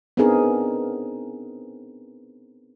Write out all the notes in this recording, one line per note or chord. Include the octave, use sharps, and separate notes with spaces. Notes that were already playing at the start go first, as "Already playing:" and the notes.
B3 C4 D4 D#4 G#4 A#4